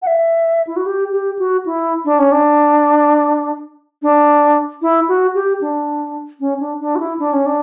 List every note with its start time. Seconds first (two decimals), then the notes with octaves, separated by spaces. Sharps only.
0.02 F#5
0.07 E5
0.67 E4
0.76 F#4
0.86 G4
1.12 G4
1.39 F#4
1.66 E4
2.05 D4
2.19 C#4
2.32 D4
4.02 D4
4.82 E4
5.09 F#4
5.35 G4
5.61 D4
6.40 C#4
6.60 D4
6.80 D4
6.96 F#4
7.00 E4
7.19 D4
7.33 C#4
7.46 D4